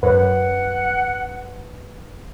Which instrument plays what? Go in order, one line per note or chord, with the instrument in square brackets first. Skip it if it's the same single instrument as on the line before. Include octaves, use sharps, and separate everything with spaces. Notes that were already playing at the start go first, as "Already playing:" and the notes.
[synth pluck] F#2 [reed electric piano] B4 [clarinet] F#5